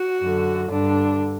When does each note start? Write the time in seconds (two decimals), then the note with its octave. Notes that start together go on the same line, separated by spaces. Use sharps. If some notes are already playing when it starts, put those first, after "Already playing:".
Already playing: F#4
0.21 F#2 D3
0.71 G2 D3 D4